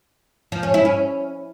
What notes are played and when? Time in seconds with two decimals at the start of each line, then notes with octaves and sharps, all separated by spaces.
0.52 F3
0.63 C#4
0.74 E4
0.85 C#4